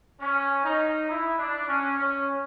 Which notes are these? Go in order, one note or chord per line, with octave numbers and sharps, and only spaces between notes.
C#4
D#4
E4
D4
C#4
C#4